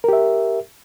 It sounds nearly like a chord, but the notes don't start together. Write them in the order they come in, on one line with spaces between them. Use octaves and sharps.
A#4 G4 E5